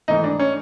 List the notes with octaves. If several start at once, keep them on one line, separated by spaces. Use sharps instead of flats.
G#2 E3 A3 D#4
D4
C#4